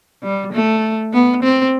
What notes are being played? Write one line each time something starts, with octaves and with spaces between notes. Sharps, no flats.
G3
A3
B3
C4